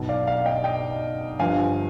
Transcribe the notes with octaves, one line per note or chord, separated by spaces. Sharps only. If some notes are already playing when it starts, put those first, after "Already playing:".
Already playing: B1 B2
D5 F5
D5 F5
D#5 G5
D#5 G5
G1 G2 F3 F5 G#5